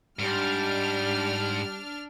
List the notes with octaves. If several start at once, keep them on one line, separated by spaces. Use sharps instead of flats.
G#2 G3 D4 F6